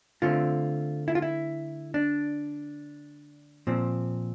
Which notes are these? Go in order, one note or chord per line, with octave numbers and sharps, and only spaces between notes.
D3 A3 C4 F4
E4
F4
E4
D4
A#2 F3 C4